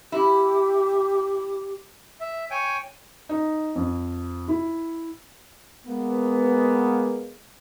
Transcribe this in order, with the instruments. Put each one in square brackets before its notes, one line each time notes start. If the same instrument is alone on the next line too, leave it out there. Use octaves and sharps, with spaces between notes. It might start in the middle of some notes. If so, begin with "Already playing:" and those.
[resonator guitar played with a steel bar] E4 [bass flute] G4
[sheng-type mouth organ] E5
C#5 G5 G#5
[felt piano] D#4
F2
E4
[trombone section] G#3 A#3 B3